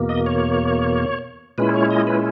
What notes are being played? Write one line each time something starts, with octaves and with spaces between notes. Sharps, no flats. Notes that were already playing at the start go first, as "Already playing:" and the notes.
Already playing: E2 B2 A#3
D#5
C#5
A#2 G#3 C#4 E4 B4
C#5
D#5
B4